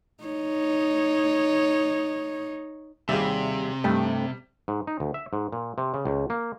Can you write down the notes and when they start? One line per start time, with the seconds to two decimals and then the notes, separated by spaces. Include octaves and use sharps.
0.24 D#4 C#5
3.09 D#2 C3 G3 G#4 E5
3.84 G2 G3 A3 D#5 G5
4.68 G#2
4.87 D#4
5.00 D2
5.14 E5
5.33 G#2
5.52 A#2
5.78 C3
5.94 C#3
6.05 C#2
6.30 A#3